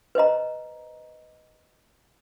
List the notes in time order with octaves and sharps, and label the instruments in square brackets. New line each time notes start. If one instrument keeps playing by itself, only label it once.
[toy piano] B4 C5 D#5 A#5